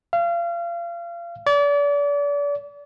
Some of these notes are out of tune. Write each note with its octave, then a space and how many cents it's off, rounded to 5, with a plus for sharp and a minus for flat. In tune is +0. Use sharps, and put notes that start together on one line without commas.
F5 -30
D5 -35